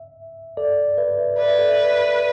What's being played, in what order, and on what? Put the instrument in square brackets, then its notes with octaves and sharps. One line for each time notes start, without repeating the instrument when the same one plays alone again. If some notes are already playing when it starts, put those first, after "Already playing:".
Already playing: [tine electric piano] E5
A4 D5
B4 E5
[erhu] B4 [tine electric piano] D5
[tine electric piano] E5
A4 D5